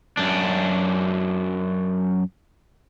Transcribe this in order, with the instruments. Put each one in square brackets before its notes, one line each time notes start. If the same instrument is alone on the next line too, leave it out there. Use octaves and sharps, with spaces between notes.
[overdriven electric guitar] F#2 D4